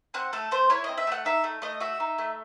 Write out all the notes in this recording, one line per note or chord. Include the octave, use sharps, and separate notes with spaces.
C4 F#5
A3 A4
A3 C5
E4 C#5
C4 D#5
E5
A3 F#5
D#4 E5
A3
A3 D#5
F#4 E5
D#4
A3